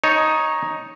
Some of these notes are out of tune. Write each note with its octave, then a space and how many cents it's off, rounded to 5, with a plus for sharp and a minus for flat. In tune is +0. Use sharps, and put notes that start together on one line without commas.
D#4 +5 C#5 +0 A5 +0